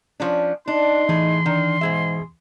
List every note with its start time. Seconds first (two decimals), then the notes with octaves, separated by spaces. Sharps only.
0.20 F3 C#4 D4
0.68 D4 D#4 C6
1.09 A2 E3 G#4
1.46 D#3 D4
1.81 G#2 B2 G#4 E5